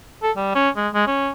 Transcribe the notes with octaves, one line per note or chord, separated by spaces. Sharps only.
A4
G3
C#4
G#3
G#3
C#4